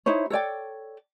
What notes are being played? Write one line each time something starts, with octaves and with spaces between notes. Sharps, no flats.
D#4 E4 C5 C#5
A4 C#5 D5 G5